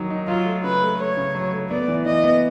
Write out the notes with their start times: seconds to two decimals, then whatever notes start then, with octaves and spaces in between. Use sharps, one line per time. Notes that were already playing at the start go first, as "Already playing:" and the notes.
Already playing: D#3 F#3 A#3 D#4
0.10 D#4
0.28 F#3 F4
0.45 A3
0.64 C#3 B4
0.82 A3
0.99 A3 C#5
1.17 C#3
1.35 F#3
1.53 A3
1.70 B3 D5
1.88 E3
2.06 E3 D#5
2.24 B3